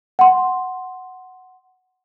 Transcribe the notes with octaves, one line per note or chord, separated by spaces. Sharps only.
F#5 C6